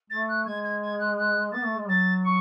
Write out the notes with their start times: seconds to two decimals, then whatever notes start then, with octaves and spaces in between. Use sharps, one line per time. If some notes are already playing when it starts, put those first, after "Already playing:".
0.10 A3 A6
0.28 F#6
0.46 G#3 G#6
0.64 G#6
0.81 G#6
0.99 F#6
1.18 F#6
1.52 B3 A6
1.65 A3
1.77 G#3
1.89 F#3 A6
2.24 C#6